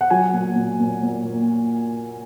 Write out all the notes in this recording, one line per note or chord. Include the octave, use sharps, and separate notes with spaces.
F#5
F#3 G#5
A#2
A#2
A#2
A#2
A#2